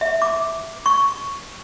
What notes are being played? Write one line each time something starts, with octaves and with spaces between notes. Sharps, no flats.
E5
D6
C#6